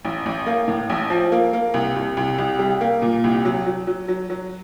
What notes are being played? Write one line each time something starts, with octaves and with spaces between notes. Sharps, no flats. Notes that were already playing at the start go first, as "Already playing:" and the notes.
A1
A1
A#3
A2
A1
F3
A#3
A#3
C2
C2
C2
C2
G3
A#3
A#2
C2
F#3
F#3
F#3
F#3
F#3